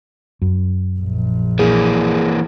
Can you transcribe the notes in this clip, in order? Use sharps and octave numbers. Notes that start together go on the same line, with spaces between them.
F#2
A#1
E3 A#3 G#4